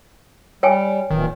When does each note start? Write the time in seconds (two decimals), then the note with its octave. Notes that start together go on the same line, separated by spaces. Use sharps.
0.63 G3 C#5 G5 G#5
1.10 D1 A#2 D#3 E3